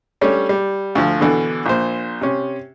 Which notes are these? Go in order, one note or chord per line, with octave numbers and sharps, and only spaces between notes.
G3 A3 C#4 D4 C#5
G3
D2 F3
B2 D3 E3
A#1 A#2 C5
C3 C#4